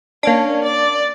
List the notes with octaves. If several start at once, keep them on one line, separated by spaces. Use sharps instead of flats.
A#3 C#4 D4
D5